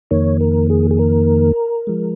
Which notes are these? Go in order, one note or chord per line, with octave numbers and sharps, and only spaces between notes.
F2 D#3 A#3 C#5
A#4
G#4
G#4
A#4
F3 G#3